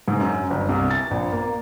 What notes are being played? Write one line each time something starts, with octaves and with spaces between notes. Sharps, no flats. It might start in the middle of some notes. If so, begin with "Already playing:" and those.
G#2
F#2
G1
C2
A6
A#1
A#3